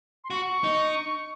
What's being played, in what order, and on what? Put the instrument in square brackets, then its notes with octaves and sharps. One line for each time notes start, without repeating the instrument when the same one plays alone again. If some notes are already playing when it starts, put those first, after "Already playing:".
[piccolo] C6
[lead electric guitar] F#4 [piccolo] C#6
[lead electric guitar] D#4